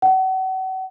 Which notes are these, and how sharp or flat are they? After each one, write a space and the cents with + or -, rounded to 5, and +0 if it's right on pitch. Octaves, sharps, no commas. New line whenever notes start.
F#5 +35